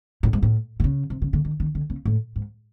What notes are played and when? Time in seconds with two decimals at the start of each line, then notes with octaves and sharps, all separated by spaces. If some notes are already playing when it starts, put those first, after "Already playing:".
0.23 A2
0.33 G#2
0.42 A2
0.80 C3
0.84 C#3
1.10 C3
1.22 C#3
1.33 D3
1.45 D#3
1.60 D#3
1.75 D3
1.90 C#3
2.05 A2
2.36 G#2